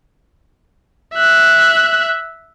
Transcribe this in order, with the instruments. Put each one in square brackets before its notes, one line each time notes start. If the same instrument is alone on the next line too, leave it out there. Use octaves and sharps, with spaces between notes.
[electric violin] E5 F#6